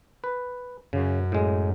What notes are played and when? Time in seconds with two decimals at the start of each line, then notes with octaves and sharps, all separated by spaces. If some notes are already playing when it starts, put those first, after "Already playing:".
0.24 B4
0.93 F#2 C#3
1.32 A2 G#3